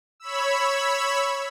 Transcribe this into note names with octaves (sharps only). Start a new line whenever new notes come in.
C#5 B5 E6